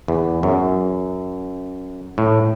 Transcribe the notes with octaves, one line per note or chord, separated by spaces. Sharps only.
E2
F#2
A2